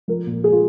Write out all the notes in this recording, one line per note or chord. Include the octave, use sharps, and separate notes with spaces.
F3 A#4
A#2
G#3 G#4
F4